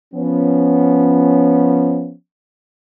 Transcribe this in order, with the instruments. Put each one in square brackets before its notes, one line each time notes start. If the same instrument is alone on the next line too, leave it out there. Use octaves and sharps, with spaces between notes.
[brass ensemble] F3 B3 C#4